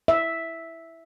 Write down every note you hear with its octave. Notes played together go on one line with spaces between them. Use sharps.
E5